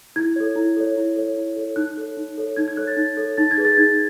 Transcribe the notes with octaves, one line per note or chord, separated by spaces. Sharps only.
E4 G#6
A4 C#5
E4
A4 C#5
E4
A4 C#5
E4
A4 C#5
D#4 F#6
A4 C#5
D#4
A4 C#5
D#4 G#6
G#6
A4 C#5 F#6
A6
D#4
A4 C#5
D#4 A6
G#6
G#4 B4
A6
D#4 G#6